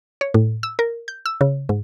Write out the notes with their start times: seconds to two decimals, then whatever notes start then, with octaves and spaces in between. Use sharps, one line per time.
0.21 C#5
0.34 A2
0.63 E6
0.79 A#4
1.08 G6
1.26 E6
1.41 C#3
1.69 G#2